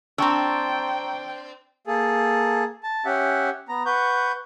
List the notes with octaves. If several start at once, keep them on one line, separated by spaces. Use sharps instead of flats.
C4 D4 G5 A#5 C#6 E6
A#3 G#4 A4
A5
C#4 G4 E5 F#5
B3 A#5
B4 F#5 C#6 G6